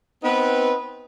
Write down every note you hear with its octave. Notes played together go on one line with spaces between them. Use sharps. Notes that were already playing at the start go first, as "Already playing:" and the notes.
B3 C4 D#4 B4